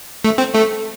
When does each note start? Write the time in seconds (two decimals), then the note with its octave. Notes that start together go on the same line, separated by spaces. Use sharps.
0.24 A3
0.38 C4
0.54 A3